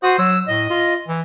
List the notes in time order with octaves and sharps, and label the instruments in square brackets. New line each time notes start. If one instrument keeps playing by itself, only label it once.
[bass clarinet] F#4 [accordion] C5 D#6
[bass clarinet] F#3 [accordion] E6
[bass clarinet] A2 [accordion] D#5
[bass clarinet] F4
E3